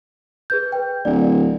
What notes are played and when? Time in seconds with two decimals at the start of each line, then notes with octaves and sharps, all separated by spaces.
0.50 G#4 B4 G6
0.72 B4 G5
1.05 D1 D5